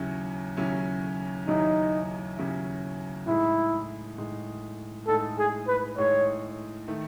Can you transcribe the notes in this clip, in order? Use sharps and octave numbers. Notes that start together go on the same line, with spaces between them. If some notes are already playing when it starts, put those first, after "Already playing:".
Already playing: D#2 C#3 F#3 C#4 E4
D#2 C#3 F#3 C#4 E4
D#2 C#3 F#3 C#4 D#4 E4
D#2 C#3 F#3 C#4 E4
A2 G#3 D#4 E4
A2 G#3 D#4
A2 G#3 D#4 A4
G#4
B4
A2 G#3 D#4 C#5
D#3 A3